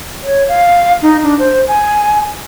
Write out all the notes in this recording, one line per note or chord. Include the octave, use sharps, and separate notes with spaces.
C#5
F5
D#4
D4
C5
G#5